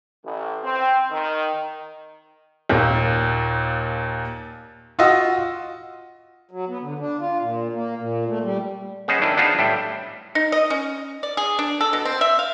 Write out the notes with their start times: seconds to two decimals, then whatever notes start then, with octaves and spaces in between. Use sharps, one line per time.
0.24 A1
0.63 C4
1.11 D#3
2.69 D#2 A#2
4.99 F4 F#4 D#5 E6
6.51 F#3
6.69 B3
6.82 D3
6.99 D4
7.19 F4
7.40 A#2
7.73 A#3
7.97 A#2
8.27 A3
8.43 G3
9.08 B3 C#4 G#4 C5 D#5
9.21 D#3 D4 E4
9.37 B3 D4 D#4 F4 G#4 C5
9.59 A2 G3 E5 G5
10.35 D#4
10.52 D#5
10.70 C#4
11.23 D5
11.37 G#4
11.59 D4
11.81 A4
11.93 B2
12.05 C4
12.21 E5
12.39 F5